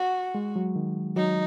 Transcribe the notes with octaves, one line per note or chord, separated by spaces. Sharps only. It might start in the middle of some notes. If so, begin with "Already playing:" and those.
Already playing: F#4
G#3
F#3
D#3
F#3 D#4